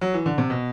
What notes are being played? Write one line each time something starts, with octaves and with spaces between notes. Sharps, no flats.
F#3
E3
D3
C3
B2